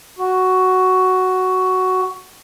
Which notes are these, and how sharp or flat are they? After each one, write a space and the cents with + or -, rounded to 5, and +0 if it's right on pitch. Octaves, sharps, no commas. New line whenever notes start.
F#4 +5